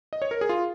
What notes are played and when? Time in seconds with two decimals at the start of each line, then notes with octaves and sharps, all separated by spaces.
0.13 D#5
0.22 C#5
0.31 A#4
0.41 G#4
0.49 F4